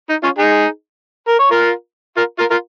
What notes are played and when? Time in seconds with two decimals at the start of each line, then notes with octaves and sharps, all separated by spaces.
0.09 D#4
0.23 C#4 F4
0.38 D#4 G#4
1.28 A#4
1.39 C#5
1.51 F4 A#4
2.17 F4 A#4
2.39 F4 A#4
2.50 F4 A#4